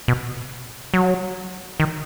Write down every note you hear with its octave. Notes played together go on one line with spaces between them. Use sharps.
B2
F#3
D#3